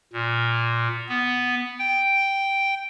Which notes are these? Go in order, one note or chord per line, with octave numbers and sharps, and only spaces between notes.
A#2
B3
G5